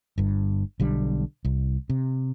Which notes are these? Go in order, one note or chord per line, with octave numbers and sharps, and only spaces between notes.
G1 G2
B1 D3 G3
C2
C3